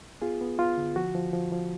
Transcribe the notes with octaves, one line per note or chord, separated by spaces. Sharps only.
B3 F4 G#4
B3
B3 F4
D3
F3 F#4
F3
F3
F3